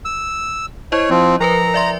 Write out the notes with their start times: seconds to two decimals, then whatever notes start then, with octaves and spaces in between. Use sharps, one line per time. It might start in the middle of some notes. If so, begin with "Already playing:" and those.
0.05 E6
0.92 E4 C5 C#5 D#5
1.10 F3 C4
1.40 F3 A#4 B4 A#5
1.74 D5 E5 C6